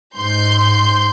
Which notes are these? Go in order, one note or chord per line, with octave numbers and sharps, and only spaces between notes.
G#2 C6 G6